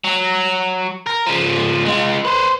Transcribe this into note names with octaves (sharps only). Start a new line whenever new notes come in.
F#3
A#4
C#3 F3
G#3 F4
B4 C5